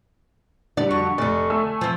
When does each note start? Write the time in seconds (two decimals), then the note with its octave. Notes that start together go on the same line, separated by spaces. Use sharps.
0.77 D3 G3 D5
0.91 F2 F#4 C#6
1.18 F1 D3 D5
1.50 A3 G#5 E6
1.81 F3 C4